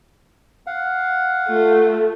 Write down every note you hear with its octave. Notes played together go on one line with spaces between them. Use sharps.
F5 F#5
A3 F4